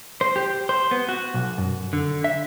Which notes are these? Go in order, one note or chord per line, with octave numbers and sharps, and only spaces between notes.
C5
G4
C5
B3
F#4
B1
F#2
D3
E5